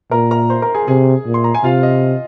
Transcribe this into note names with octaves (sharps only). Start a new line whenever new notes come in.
A#2 A#4 A#5
A#4 A#5
C5 C6
A#4 A#5
G#4 G#5
C3 G#4 G#5
A#2
C6
A#5
G#5
C3 F4 F5
D#5